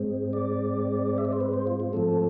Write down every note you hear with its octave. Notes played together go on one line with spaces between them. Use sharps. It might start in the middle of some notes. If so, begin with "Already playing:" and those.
Already playing: G#2 G#3 C4
D5
E5
D5
C5
B4
C5
F4
F4
G#2 F3 A3 C4 A4